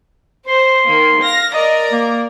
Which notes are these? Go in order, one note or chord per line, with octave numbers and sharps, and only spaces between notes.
C5 C6
D#3 A#3
F5 A#6
A#4 D5 D#5 A#5
A#3